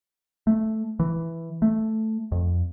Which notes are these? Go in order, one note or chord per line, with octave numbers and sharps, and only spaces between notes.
A3
E3
A3
F2